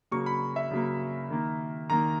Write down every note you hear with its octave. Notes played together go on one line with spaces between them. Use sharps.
C#3 F#3 A#3 C#6
B5
E5
C#3 F#3 A#3
D#3 A#3
D#3 A#3 A#5